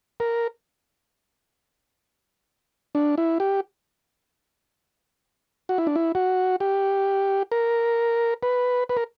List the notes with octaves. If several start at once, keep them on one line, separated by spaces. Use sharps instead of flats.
A#4
D4
E4
G4
F#4
E4
D4
E4
F#4
G4
A#4
B4
B4
A#4